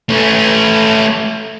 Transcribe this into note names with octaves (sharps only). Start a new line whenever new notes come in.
A3 C#4